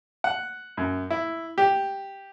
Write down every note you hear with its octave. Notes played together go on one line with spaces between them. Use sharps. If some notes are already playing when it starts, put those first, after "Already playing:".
F#5
F#2
E4
G4